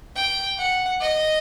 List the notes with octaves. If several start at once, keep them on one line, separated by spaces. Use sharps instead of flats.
G5
F#5
D#5